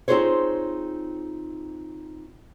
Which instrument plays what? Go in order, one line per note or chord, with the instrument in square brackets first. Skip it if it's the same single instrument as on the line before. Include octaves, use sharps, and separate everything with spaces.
[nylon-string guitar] C4 D#4 F4 G#4 C5 C#5